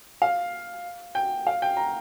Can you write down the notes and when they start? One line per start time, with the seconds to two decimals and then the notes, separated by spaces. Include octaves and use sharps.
0.22 F5
1.15 G5
1.47 F5
1.62 G5
1.77 A#5